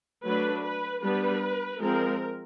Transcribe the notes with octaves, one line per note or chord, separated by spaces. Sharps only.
F#3 A3 D4 B4
B4
G3 B3 D4 B4
F3 G#3 C4 A#4